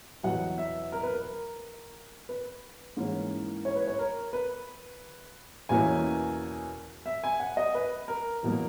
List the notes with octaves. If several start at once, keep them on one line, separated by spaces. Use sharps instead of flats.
E2 B2 F#3 F#5
E5
A#4
B4
A#4
B4
G#2 E3 A#3 C#4 E4
C#5
B4
C#5
A#4
B4
E2 B2 A#3 C#4 E4 G#5
E5
G#5
F#5
D#5
B4
A#4
E2 B2 F#3 A#3